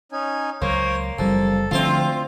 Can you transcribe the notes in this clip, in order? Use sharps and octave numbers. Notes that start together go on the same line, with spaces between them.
C#4 D#4 G#5
C#2 F3 F#3 A#3 C5 C#5
F#1 C2 F3 A4
D2 D3 F3 A3 C4 F4 E5 D6